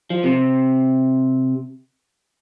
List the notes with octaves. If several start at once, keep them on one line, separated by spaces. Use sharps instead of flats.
F3
C3